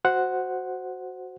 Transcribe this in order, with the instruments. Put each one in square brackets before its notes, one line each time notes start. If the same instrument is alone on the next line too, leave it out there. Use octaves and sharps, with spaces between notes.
[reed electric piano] F#4 C5 F#5